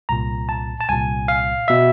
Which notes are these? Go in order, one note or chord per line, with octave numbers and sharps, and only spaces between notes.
C2 A#2 A#5
A5
A5
C2 A#2 G#5
F5
B2 E5